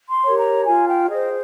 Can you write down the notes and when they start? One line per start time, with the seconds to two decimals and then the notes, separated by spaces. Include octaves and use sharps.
0.10 C6
0.24 G4 A#4 C#5
0.38 A#5
0.67 F4 G#5
0.90 G5
1.10 G#4 C5 D#5